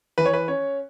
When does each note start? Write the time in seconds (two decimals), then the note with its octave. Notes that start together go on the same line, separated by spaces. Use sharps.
0.18 E3 B4
0.26 C#5
0.33 B4
0.48 C#4 C#5